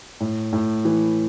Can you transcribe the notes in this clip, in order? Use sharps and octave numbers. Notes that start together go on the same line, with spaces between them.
A2
A2
E3